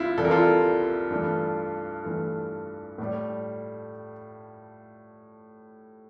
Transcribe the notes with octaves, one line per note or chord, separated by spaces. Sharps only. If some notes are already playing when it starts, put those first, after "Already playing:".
Already playing: C2 C3 E4 F4
C2 C3 E3 G3 A4
A#4
F4 A4
G2 E3 A3
G2 E3 A3
A2 G3